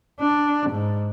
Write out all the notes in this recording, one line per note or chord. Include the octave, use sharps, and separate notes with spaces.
D4
G#2